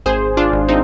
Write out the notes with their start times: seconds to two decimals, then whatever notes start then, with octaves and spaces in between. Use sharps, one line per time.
0.06 G#1 G#4 C5
0.37 D4 F4
0.53 G#1
0.68 C4 D#4